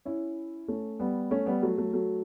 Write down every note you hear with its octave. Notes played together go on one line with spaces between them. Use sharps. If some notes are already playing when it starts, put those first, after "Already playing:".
C#4 E4
A3 C#4
G3 B3
A3 C#4
G3 B3
F#3 A3
F#3 A3
F#3 A3